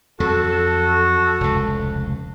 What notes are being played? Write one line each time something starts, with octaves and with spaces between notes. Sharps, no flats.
F2 F#3 F#4 A4
F1 C#2